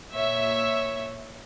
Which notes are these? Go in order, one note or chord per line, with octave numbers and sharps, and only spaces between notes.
A#2 C#5 E5